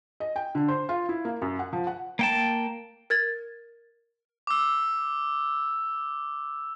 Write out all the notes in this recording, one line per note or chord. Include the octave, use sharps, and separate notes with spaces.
D#5
G5
D3
C5
F4
E4
A#3
F#2
F#5
F3
F#5
A#3 G5 A5
A#4 G#6 A6
D6 E6